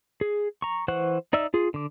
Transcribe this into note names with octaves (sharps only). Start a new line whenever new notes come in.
G#4
A#5 C#6
E3 C5 F#5 C#6 F#6
D#4 D5 E5 E6
F4 G#4
D3 D6